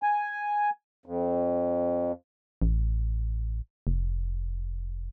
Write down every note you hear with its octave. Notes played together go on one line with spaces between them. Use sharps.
G#5
F2
A1
F1